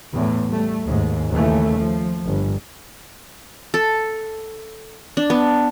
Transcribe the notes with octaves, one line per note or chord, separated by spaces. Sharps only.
E2 A2
G3 A3
D#2 G#2
D#2 C#3 E3 A3
F3
G1
A4
D4
B3